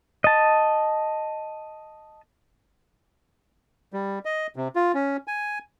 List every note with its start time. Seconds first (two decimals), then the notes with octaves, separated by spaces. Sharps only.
0.24 D#5 A5
3.93 G3
4.25 D#5
4.56 C3
4.76 F4
4.94 C#4
5.27 G#5